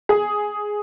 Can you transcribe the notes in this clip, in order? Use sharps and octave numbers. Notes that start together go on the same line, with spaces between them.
G#4